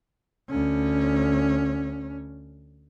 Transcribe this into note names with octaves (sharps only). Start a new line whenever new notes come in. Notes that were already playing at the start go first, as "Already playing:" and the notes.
D2 C#4